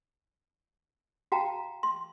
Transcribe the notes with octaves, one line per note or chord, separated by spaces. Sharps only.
F#4 F5 G5 A5 A#5
C6